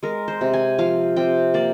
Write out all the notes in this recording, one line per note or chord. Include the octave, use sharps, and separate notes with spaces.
G#3 A#4
C5
C3
G#5
F3 F5
C3 G5
A#3 D5